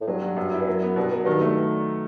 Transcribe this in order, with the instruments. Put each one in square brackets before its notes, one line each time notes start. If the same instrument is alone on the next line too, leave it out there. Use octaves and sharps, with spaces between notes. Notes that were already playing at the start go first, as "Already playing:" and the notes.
[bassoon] A2
[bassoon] G2 [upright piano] F#3
[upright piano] F#3
F#2
E4
[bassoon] G2
[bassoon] F#2 [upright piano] F#3
[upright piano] B3
[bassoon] G2 [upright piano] B2
[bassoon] F#2 [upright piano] F#3
[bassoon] G2 [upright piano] D#3
[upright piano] A3